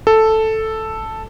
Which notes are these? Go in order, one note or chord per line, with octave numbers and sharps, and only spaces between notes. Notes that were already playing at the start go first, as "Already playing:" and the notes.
A4